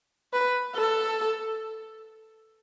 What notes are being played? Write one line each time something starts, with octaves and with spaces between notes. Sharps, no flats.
B4
A4